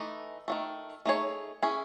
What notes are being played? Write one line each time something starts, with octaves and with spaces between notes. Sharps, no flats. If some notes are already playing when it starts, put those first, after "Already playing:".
Already playing: E3 A3 D#4
D#3 F#3 A3
A3 D#4 G#4 C#5
C#4 E4 G#4